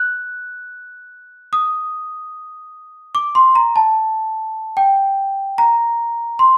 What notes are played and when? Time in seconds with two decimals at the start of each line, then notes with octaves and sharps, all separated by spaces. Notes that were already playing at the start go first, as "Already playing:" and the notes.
Already playing: F#6
1.53 D#6
3.15 D6
3.35 C6
3.55 A#5
3.76 A5
4.77 G5
5.58 A#5
6.39 C6